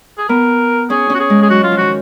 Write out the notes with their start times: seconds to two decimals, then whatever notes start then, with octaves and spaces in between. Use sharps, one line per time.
0.18 G#4
0.29 B3 A#4
0.90 C#4 G#4
1.10 C#4 F#4
1.20 G#4
1.30 G#3
1.42 G#4
1.50 F#3 F#4
1.64 F4
1.71 F3
1.77 D#3 F#4